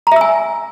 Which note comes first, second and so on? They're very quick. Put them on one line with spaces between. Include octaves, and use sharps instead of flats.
A#5 E5 E6 G#5